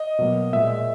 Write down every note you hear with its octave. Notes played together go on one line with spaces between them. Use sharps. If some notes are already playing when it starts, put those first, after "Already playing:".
Already playing: D#5
B2 F#3 A#3
A#2 G#3 E5